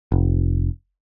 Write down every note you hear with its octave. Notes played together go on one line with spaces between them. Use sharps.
F1